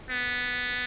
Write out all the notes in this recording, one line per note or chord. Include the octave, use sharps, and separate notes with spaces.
B3